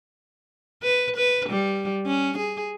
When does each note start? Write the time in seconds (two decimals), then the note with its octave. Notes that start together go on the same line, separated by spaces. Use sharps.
0.83 B4
1.16 B4
1.49 G3
2.06 C#4
2.38 G#4